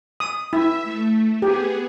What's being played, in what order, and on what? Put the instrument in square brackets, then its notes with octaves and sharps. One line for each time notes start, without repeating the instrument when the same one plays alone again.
[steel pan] D#6
[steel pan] E4 [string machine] E5
[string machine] A3
[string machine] B3 G#4 [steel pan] G4